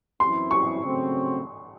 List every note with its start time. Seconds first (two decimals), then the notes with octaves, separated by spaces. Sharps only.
0.20 F#2 E3 C4 E4 C6
0.51 C#6
0.82 C#3 F#3 A3 C4